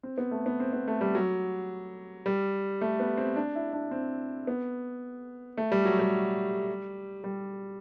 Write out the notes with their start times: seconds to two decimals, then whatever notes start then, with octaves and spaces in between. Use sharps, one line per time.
0.03 C4
0.18 B3
0.31 A3
0.46 B3
0.60 C4
0.73 B3
0.88 A3
1.01 G3
1.15 F#3
2.26 G3
2.81 A3
3.00 B3
3.17 C4
3.36 D4
3.55 E4
3.73 D4
3.91 C4
4.47 B3
5.58 A3
5.72 G3
5.85 F#3
5.99 G3
7.24 G3